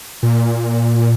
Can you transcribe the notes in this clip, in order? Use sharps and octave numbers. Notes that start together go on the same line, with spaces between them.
A#2